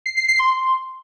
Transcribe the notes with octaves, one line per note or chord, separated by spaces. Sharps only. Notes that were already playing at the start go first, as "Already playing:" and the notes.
C7
C7
C7
C6